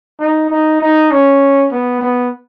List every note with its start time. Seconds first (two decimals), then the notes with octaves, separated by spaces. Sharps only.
0.20 D#4
0.50 D#4
0.81 D#4
1.11 C#4
1.72 B3
2.01 B3